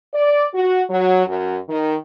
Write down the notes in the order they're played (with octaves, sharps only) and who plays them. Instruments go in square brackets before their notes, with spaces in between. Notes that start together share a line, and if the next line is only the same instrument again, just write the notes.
[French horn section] D5
F#4
F#3
F#2
D#3